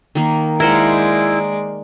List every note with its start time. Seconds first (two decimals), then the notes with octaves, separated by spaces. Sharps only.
0.15 D#3 A#3
0.60 G#3 E4 A#4 C5 D5 F#5